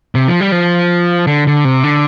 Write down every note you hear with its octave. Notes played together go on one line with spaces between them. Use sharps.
C3
F3
G3
F3
D3
D3
C3
D3